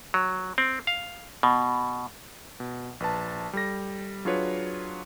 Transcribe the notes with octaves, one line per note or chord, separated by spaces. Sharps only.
F#3
C4
F5
B2
B2
A#1 B4 A5
G3 A4 A#6
F#3 D4 F4 G#4 B4 C#5